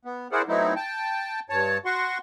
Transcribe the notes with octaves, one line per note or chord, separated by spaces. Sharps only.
B3
E4 G#4 A#4 C5 D5 F#5
F#3 A3 B3 C4 D#4 E4
G5 A5
G2 C#5 A5
F#4 F#5 C6 C#6